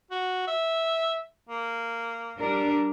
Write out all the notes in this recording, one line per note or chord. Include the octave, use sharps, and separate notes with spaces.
F#4
E5
A#3
G3 D4 A#4